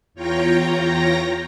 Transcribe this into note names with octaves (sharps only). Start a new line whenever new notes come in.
E2 F4 C#5 G5 A#5 A#6